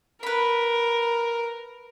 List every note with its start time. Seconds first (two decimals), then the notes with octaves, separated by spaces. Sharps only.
0.23 A#4 B4 B5